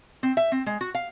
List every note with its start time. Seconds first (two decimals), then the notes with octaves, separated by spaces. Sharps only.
0.23 C4
0.37 E5
0.52 C4
0.66 G#3
0.81 F#4
0.95 F5